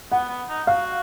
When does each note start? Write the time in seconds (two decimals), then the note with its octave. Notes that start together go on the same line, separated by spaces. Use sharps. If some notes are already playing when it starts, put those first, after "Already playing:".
0.11 B3 F#5
0.29 B3
0.49 D#4
0.67 F#4 F5